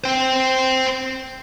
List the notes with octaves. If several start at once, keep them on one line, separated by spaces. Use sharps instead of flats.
C5 G5